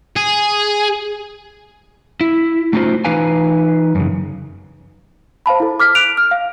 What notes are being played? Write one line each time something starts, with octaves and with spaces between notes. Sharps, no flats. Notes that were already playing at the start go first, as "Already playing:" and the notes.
G#4
E4
A3 C#4 D#4 F4 F#4 C5
E3 D#4 B4 F5 G#5
F#2 C#3
C5 F5 A5 B5
E4 A4
D6 F6 B6
F#6 D7 F7
F6
F5